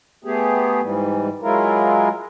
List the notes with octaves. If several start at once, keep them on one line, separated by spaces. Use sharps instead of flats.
A3 B3 G4 G#4
G#2 E3 G3
F#3 G#3 E4 F4 A#4